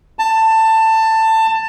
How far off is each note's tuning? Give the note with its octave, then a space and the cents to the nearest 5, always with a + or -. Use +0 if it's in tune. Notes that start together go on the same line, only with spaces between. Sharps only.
A5 +15